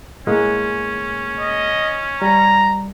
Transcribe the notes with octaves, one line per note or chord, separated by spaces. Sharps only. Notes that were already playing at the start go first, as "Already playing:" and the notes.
A2 G#3 A#3 C#4
D#5
G3 A#5